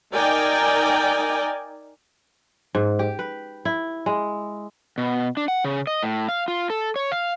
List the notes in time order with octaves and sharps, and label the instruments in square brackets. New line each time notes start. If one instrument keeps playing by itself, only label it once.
[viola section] D#4 A#4 D5 D#5 G5 G#5
[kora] G#2
G4
B4
E4
G#3
[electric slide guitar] B2
D4
F#5
C#3
D#5
A2
F5
F4
A4
C#5
F5